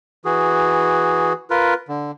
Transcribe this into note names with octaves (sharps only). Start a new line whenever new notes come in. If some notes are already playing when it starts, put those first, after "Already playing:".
E3 F#4 G#4
F4 A#4 B4
D3